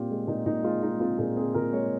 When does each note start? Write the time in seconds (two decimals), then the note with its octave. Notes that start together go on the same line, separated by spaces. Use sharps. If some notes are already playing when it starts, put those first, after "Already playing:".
Already playing: A#2 C4 F4 G4
0.10 G#3
0.27 A#2 D#4
0.46 A#2 D#4
0.63 G#3 F4
0.82 G#3 D#4
1.00 C4 F4
1.18 A#2 G#4
1.36 C4 G#4
1.54 A#2 A#4
1.73 G#3 C#5